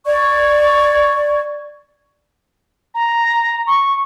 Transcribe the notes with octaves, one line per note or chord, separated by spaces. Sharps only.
D5 C#6 G#6
A#5
C#6